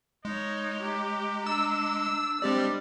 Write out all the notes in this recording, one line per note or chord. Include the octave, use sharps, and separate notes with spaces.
G#3 D#4 C#5
G4 A#5
D4 E6
G3 G#3 C4 D4 G4 D5